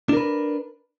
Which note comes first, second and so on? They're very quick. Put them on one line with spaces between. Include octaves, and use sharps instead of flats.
D4 A#4 B4